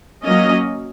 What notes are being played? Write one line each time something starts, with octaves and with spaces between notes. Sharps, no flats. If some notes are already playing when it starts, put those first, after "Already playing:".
F#3 A#3 C#4 D#5